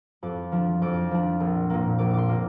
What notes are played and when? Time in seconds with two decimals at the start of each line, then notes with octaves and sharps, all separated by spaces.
0.23 F2 D6
0.52 F3 D4
0.82 F2 D6
1.11 F3 D4
1.40 A#1
1.70 A#2 A#3
1.98 A#1 D6
2.14 C6 D6
2.29 A#2 A#3